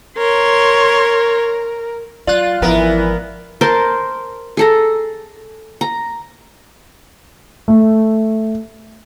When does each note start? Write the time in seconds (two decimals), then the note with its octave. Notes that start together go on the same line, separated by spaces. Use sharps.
0.17 A#4 C#5 C6
2.27 F#3 F4 D5 F#6
2.62 G#1 E3 F3 B3 E4 A#4
3.61 A#4 C5 A5
4.57 G#4 A4 A#5
5.81 A#5
7.68 A3